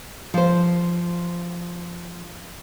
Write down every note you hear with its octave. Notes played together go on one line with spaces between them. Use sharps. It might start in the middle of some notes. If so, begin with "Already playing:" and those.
F3 C5